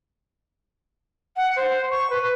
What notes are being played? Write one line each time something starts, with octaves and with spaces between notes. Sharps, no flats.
F#5
C5
C#6
B4